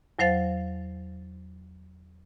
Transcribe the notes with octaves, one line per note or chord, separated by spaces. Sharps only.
E2 F#3 C5 F5 A6